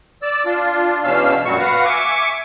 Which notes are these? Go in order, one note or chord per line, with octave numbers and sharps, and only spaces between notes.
D5 E6
D4 F4
E2 B2 C#4 D4 F5 E6
F#2 A#2 F#3 G3 F#4 C#6
F#4 B4 F5 F#5
E5 G#5 C#6 D6